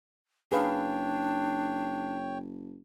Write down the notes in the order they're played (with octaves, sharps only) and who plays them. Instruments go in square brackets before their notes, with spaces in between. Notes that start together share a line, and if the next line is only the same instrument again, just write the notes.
[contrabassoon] F#1 [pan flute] D4 [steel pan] G#4 B4 F5 [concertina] C#5 G5